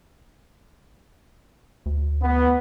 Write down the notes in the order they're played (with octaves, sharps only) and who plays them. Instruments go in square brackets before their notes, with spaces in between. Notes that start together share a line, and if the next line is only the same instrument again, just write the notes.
[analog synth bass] D2
[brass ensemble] B3